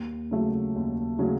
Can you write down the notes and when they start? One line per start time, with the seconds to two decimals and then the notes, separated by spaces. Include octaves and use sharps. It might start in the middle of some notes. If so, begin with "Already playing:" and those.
Already playing: D#2
0.31 C#3 F#3 A3
0.76 D#2
1.19 C#3 F#3 A3